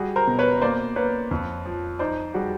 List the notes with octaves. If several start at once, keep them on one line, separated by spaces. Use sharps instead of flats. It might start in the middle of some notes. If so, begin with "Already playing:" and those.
Already playing: G3 F#4 G#4
A#4 C5
B2
B4 C#5
C#5
A#3 C5 D5
A#3 B4 C#5
F2
F3
D#4 C5 D5
G3 F#4 G#4